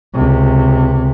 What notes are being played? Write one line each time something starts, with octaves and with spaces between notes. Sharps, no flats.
C#2 C3